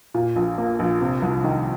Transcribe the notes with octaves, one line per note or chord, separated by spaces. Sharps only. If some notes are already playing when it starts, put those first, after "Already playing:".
A#2
A#1
A#3
A#1
C3
C2
D#3